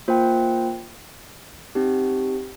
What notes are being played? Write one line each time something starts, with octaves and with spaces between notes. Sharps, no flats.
A#3 F4 C5 G5
C4 D#4 G4